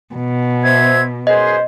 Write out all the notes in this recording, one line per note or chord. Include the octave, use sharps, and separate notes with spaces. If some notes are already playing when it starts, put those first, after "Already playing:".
B2
C5 E5 G#6
F#2 G#4 B4 C5 D#5